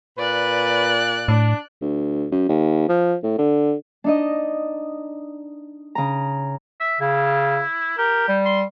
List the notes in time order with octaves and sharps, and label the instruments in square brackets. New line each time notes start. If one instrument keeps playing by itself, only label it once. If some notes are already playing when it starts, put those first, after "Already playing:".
[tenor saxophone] A#2 [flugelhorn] B4 [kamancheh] D5 F#6
[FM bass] A2 [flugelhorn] D4
[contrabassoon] D2
F#2
D#2
F3
A2
D3
[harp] D4 D#4 D#5
C#3 A#5
[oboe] E5
[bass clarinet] C#3 [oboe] E4
[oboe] G4 [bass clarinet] A#4
[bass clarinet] G3
[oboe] C6